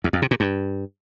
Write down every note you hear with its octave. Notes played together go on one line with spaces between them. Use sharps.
E2
F2
C3
A#2
G2